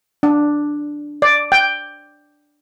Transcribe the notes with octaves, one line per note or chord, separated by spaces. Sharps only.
D4
D5
G5